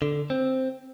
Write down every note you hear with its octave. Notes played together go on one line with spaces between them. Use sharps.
D3
C4